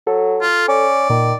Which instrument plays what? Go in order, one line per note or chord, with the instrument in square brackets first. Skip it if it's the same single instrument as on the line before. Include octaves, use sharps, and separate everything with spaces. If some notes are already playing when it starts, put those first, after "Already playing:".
[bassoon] F#3 [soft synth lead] A4
[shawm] F4
[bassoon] C#4 [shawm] D5
[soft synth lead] A#2 [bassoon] D#3